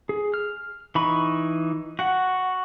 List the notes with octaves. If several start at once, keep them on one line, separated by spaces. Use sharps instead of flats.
G#4
F6
E3 D#4 B5 C#6
F#4 F#5